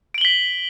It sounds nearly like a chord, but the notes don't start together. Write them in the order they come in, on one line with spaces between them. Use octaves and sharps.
D7 F#7 G7 B6